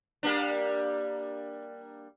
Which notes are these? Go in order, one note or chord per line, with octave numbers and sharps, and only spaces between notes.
G3 A#3 D4